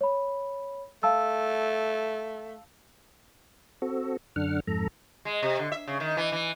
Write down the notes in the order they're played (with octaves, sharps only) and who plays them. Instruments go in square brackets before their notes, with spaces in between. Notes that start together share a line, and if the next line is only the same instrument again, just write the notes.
[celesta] C#5 B5
[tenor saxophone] A3 [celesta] F5 A5 E6
[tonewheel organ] C4 F#4 A4
F#2 D3 D4 F#5 F6
F2 G#2 A4 A#5
[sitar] G#3
C3
D3
E5
C#3
D#3
E3
E3